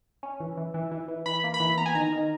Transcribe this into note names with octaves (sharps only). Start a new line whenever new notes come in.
C#4
E3
E3
E3
E3
E3
E3 B5
A#3
B5
E3
B3 A#5
G#5
D#3 A#5
D#3